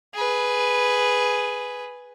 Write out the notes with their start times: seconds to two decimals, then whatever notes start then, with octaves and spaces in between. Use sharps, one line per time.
0.15 G#4 B4